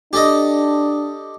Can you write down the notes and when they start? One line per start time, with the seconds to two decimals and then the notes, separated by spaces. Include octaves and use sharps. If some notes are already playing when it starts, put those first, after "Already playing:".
0.13 D4 G4 A4 D#5